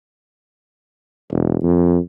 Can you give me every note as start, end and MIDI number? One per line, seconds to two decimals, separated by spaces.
1.31 1.57 28
1.63 1.98 41